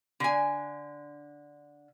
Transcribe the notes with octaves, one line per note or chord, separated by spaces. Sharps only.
D3 G#5